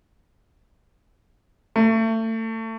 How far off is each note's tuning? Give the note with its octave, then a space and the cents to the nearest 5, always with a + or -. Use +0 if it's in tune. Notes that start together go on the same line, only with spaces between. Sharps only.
A3 +30